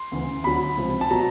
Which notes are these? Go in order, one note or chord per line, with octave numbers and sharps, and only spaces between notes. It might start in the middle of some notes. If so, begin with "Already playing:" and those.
Already playing: C6
D2 C#3 E3
D2 D3 F#3 B5
C#2 C3 F3
A5
B2 F#3 A#5